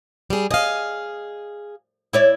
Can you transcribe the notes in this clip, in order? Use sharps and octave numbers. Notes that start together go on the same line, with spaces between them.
G3 G#4
G#4 D#5 F5
E4 C#5 D5